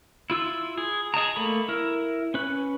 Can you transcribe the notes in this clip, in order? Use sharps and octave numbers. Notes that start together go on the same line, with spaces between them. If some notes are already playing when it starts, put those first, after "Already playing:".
E4 F4 E6
G#4
G#4 D#5 A5 A#5
A3 A#3 B5
E4 A#4
C#4 B4